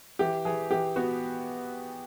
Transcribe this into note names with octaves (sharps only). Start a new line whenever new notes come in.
E3 G4
E3 G#4
E3 G4
B3 F#4